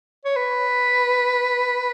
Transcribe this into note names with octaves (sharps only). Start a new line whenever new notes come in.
C#5
B4